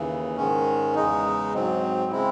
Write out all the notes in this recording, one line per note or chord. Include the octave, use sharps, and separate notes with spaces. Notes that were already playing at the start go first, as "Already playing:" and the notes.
Already playing: D#2 C#3 E3
G#2 D#3 G#3 C#4
E2 C#3 G#3 D#4
G#2 F#3 C4
C#3 G#3 C4 E4